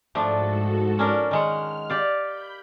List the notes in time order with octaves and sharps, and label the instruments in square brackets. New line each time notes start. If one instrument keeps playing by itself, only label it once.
[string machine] G#2 F#4 A4 [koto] F3 A3 D4
[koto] C#4 D4 A#4
[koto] D#3 G#3 F#5 [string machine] F6
[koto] G4 D5 F5
[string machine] B5 G6